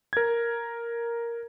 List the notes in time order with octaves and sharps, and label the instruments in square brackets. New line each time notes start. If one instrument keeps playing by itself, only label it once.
[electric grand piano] A#4 G#6